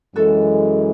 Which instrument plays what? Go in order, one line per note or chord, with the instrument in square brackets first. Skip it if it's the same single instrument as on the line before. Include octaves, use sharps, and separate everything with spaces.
[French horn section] F#2 E3 G#3 [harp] F#4 A4